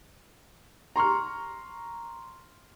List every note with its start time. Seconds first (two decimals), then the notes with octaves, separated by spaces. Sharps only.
0.96 A#5 C6 C#6 F6